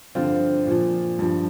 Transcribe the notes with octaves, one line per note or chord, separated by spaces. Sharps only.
G2 D3 F3 C4 F4
A#2 F3
G2 F3